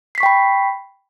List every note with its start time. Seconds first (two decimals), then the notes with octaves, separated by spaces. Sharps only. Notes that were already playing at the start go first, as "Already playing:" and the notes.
0.15 C7
0.18 B6
0.20 C#6
0.23 G5
0.26 B5